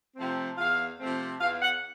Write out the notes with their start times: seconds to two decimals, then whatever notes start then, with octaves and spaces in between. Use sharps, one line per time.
0.16 C3 F3 A3 C4
0.58 E2 F5
0.99 C3 F3 A3 C4
1.41 E2 F5
1.62 F#5